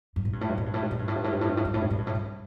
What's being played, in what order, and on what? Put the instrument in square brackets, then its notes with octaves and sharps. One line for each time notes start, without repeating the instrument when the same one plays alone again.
[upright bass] G2
A2
G2
A2
G2
A2
G2
A2
G2
A2
G2
A2
G2
A2
G2
A2
G2
A2
G2
A2
G2
A2
G2
A2
G2